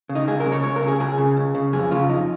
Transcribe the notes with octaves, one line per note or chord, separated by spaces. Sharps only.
C#3
D#4
C#2 G#4
A#4
C#3
C#5
C#2 C#5
A#4
C#3
G#4
C#2 G#4
C#3
C#2
C#3
F2 G#4
C#3 F4
F2 D#4